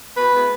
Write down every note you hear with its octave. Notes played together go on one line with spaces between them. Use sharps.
B2 B4
G#3 B3 E4